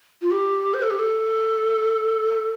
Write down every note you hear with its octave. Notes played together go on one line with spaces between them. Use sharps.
F4
G4
C5
A4
G4
A4